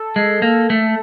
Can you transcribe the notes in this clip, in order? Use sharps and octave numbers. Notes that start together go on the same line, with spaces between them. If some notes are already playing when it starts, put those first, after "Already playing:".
Already playing: A4
G#3
A#3
A3